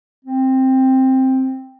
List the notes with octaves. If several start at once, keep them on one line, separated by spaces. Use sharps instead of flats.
C4